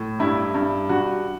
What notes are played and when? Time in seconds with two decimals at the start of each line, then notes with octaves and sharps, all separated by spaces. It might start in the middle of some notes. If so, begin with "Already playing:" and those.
Already playing: A2
0.19 G2 E4
0.54 G2
0.89 G2 F#4